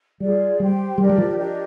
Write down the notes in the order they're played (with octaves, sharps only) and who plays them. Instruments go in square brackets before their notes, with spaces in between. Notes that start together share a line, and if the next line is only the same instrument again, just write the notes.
[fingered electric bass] G3 [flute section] F4 G#4 D5
[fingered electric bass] G3 [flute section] G4 C5 G5
[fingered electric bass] G3 [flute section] D4 G4 A#4 D5
[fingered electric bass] G3
F3
[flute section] D4 G4 A#4 D#5